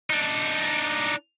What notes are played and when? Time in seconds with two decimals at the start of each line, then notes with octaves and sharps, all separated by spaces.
0.10 D4 D#4